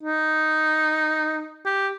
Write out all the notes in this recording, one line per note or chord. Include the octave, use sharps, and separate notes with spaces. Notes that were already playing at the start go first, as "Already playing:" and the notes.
D#4
G4